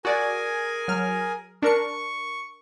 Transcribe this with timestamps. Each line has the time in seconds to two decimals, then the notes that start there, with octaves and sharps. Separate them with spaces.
0.05 F#4 G#4 A#4 D5 G#5
0.88 F#3 F6
1.62 D4 A#4 C#6 C#7